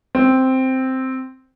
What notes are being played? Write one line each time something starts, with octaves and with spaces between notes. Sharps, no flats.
C4